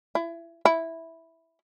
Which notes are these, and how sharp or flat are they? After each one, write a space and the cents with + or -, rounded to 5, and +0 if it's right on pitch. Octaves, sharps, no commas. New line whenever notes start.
E4 +25
E4 -5